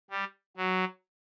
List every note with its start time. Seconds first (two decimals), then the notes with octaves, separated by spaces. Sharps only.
0.10 G3
0.57 F#3